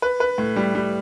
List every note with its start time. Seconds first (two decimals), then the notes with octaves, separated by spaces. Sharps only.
0.02 B4
0.20 B4
0.38 A2
0.56 G3
0.75 G3